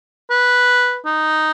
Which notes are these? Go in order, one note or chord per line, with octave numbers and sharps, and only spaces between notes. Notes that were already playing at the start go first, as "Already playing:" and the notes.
B4
D#4